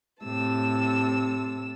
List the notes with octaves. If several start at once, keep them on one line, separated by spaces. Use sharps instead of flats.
A2 C3 A5 E6